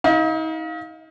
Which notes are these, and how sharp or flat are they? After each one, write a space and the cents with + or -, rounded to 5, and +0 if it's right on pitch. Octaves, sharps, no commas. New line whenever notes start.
D#4 +40 F5 +15